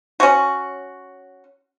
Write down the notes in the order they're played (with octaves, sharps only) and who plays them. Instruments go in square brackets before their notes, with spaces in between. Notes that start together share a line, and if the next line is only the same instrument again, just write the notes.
[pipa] C#4 F#4